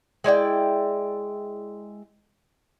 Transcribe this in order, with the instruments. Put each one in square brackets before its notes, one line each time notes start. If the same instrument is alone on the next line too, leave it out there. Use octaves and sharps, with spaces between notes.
[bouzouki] G#3 E4 D5 G5